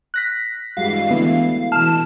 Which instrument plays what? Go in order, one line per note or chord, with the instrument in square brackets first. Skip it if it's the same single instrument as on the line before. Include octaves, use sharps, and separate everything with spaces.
[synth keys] F#6 A#6 B6
[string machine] G2 E3 [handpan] G3 G#3 F#4 [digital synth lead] F5
[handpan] D3 A3 E4 [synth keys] B3
[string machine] B2 E3 [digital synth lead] A5 [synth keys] F6